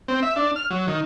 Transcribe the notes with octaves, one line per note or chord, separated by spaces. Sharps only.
C4
E5
D4
F6
F#3
D#3